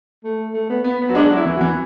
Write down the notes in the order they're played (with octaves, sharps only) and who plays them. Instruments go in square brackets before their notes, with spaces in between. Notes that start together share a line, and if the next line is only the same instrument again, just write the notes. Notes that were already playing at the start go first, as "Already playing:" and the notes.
[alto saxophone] A3
A3
B3
[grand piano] B3
[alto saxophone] B3
[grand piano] F#3
[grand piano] G#3 [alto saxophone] D4
[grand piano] F#3
[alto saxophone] E4
[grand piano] E3
[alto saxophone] F#4
[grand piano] E3